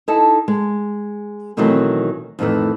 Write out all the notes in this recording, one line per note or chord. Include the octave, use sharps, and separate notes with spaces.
D#4 E4 A4 A5
G#3
B2 D#3 E3 F#3 A3 C4
F2 A2 D#3 E3 A3